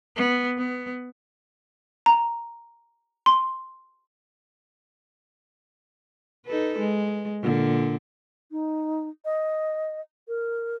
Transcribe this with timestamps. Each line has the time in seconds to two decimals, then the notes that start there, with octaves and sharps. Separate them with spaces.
0.16 B3
0.58 B3
2.06 A#5
3.26 C6
6.46 D#4 A4 B4
6.79 G#3
7.42 A#2 D3
8.52 D#4
9.25 D#5
10.28 A#4